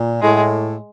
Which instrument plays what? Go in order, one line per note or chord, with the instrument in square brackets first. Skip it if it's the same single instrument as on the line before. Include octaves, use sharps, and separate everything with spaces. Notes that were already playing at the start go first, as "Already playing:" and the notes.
Already playing: [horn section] A#2
[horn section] A2 [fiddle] G#3